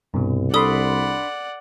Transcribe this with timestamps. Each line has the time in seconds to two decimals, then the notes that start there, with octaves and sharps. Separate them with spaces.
0.14 C2 G2 B2
0.54 D4 A4 D5 F#5 B5 C6 D#6